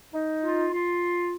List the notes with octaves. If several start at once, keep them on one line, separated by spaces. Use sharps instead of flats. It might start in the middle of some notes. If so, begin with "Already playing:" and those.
D#4
F4
F4